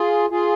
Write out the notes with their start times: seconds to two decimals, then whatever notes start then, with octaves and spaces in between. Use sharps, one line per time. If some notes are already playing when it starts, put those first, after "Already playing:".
Already playing: F4 G#4
0.30 F4 G#4